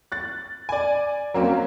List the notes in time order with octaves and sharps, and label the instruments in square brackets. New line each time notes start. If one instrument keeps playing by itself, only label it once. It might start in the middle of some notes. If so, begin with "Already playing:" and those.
[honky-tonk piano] F#6 A6
D5 G#5
F#3 A#3 C4 C#4